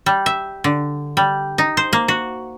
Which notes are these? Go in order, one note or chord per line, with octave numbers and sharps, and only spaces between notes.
G3
E5
D3
G3
D#4
C5
A#3
F#4